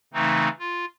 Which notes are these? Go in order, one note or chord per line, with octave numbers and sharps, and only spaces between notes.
C#3 E3 A3 C4 D#4
F4